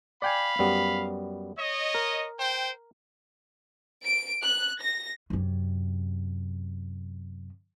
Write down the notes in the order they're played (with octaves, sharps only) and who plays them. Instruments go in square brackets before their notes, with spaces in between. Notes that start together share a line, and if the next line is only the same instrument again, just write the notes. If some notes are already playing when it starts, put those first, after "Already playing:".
[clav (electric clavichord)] D5 G5 G#5 [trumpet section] F5 B5
[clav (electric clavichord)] F#2 G3 B3
[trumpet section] C#5 D#5
[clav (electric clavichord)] A#4
[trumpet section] C5 G5
[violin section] D7
F#6
A#6
[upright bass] F#2 C3